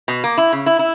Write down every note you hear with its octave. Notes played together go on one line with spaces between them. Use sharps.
B2
A#3
E4
C#3
E4
E4